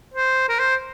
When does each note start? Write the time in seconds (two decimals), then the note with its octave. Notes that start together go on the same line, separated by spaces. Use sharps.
0.14 C5
0.49 A#4
0.59 C5